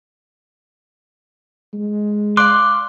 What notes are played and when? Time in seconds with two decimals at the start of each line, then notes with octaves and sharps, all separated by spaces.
1.73 G#3
2.37 D5 F5 C6 D6 F#6